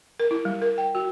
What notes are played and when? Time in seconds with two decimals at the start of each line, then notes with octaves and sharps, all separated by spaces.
0.20 A#4
0.31 E4
0.45 G3
0.62 A#4
0.78 G5
0.95 F#4